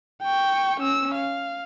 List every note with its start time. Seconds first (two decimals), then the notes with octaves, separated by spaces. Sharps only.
0.23 G5 C#6
0.81 C#4 E6
1.15 F5